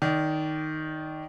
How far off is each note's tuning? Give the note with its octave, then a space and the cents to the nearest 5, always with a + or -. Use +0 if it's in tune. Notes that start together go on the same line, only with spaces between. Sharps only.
D#3 +0 D5 -25